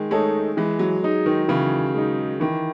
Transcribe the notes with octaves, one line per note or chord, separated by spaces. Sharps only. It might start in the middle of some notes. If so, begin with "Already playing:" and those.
Already playing: D#3 G#3
G#3 A3 D#4 A4 C#5
E3 G#3
F#3
G#3 D#4
D#3
C#3 E3
G#3 D#4
D#3 E3